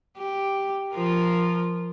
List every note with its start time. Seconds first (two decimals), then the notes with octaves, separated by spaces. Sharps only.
0.17 G4
0.94 F3 F4 A#4